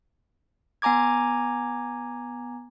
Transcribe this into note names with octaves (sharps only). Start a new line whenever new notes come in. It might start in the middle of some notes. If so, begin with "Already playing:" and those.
B3 G#5 A#5 D6 G#6